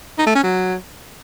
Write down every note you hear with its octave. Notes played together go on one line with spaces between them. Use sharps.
D#4
A3
C#4
F#3